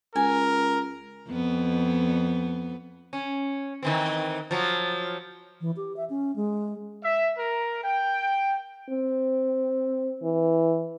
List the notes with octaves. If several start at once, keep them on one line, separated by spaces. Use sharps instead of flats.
C#2 A#4 G#5
F2 B3
C#4
D#3 E3 C4
F3 F#3
E3
G4
E5
C#4
G#3
E5
A#4
G5
C4
E3